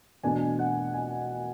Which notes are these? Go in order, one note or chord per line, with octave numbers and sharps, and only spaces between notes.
E2 B2 A3 D4 G#5
F#5
G#5